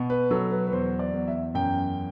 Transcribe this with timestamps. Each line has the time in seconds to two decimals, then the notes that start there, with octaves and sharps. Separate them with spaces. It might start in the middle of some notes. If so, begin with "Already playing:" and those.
Already playing: B2
0.10 B4
0.30 F#3 A4
0.51 B4
0.67 B4
0.72 E2 C5
0.99 D5
1.14 E2
1.28 E5
1.54 F#2 G5